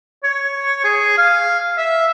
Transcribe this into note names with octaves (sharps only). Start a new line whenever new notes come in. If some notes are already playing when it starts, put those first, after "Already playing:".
C#5
G#4
F5
E5